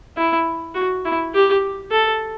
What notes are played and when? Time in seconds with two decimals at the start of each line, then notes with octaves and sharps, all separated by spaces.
0.17 E4
0.75 F#4
1.05 E4
1.34 G4
1.92 A4